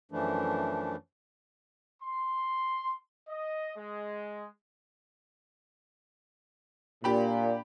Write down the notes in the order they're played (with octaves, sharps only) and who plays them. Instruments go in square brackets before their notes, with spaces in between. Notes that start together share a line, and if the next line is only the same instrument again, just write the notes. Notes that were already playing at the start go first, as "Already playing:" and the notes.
[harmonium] F#2 E3 F3 A3 D4
[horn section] C6
D#5
G#3
[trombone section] A#2 [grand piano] D4 G4 B5